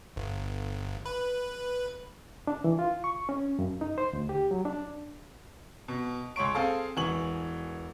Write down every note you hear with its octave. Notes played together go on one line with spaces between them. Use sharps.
G1
B4
D4
E3
F4
C#6
C#4
F#2
D#4
C5
D2
G4
F#3
D4
B2
C#2 C#5 C6 C#6 D7
C4 G#4 A4 F5 A5
E1 E3 G#5 C#6 F#7